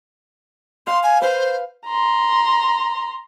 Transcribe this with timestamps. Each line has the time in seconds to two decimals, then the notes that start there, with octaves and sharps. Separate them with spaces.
0.87 F5 C6
1.03 G#5
1.22 B4 C5 F5
1.87 A#5 C6